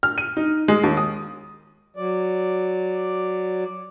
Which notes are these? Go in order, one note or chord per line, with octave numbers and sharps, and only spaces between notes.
F6
D#7
D#4
G#3
D#2
D#6
F#3 D5